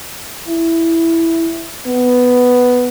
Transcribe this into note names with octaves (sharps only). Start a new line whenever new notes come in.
E4
B3